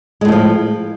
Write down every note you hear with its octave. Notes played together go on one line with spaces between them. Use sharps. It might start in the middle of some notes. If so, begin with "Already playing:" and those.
A2 D#3 F3 G#3